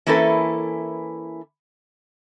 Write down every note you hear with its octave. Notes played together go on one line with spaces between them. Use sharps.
E3 A#3 C#4 E4 A4 B4